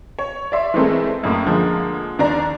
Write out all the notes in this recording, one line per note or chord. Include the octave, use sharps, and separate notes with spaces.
C#5
D5 E5 C6
E3 G#3 A3 C4 A4 A#4
F#2 A2 A#3
D3 F3 G#3 A#3
D#2 D4 D5 A#5